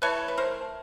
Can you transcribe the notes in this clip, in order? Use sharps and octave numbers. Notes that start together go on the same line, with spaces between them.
E3 A3 B4 C#5
B4
A#4 C5